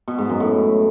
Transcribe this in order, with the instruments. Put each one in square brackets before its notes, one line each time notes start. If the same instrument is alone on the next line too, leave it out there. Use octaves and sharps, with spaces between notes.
[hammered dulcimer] B2
G#2
F#2
A2